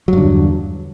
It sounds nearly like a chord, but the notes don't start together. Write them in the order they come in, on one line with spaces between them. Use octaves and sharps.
F#3 G2 D3 E2